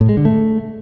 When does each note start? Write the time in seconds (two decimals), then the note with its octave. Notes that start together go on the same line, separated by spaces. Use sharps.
0.01 A2
0.09 G#3
0.17 D3
0.25 A3